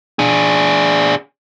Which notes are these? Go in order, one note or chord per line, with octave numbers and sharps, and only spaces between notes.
D4 G#4